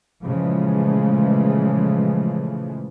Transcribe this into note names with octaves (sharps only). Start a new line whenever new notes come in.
A#2 C#3 E3 F3 G#3 A3